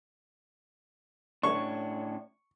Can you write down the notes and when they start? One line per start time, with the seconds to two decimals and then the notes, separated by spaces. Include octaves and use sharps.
1.43 A2 C#4 D4 C#6